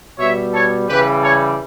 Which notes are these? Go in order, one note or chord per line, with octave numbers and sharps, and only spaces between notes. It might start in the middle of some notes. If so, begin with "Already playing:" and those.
B2 G3 C#5 E5
A4 C#5
C#3 E3 G3 G4 B4
A4 C#5